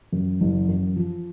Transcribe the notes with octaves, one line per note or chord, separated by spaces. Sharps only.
F#2
F#1
F#2
F3